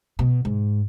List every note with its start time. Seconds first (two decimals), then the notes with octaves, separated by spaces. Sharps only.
0.19 B2
0.45 G#2